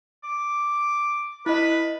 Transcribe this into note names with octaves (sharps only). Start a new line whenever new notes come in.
D6
E4 B4 D#5